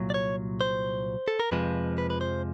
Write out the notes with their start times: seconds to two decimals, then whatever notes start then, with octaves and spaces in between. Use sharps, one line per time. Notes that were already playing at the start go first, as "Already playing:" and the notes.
Already playing: C2 A#2 F#3
0.10 D5
0.14 C#5
0.61 C5
1.28 A4
1.40 A#4
1.51 F2 C3 F3 G#3 B4
1.98 B4
2.10 B4
2.21 C5